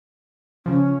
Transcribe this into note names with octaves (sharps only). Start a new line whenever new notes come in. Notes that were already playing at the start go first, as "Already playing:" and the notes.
C#3 F3 C#4